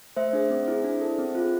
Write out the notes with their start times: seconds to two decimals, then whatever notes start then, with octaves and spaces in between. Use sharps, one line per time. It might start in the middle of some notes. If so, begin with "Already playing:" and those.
0.16 A3 C5 E5
0.33 D4 G#4
0.50 C4
0.68 E4 G#4
0.84 D4
1.01 A4
1.18 C4
1.35 F4 G#4